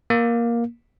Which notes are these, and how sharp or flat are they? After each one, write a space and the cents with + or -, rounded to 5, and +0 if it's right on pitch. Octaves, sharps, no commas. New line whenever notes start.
A#3 +10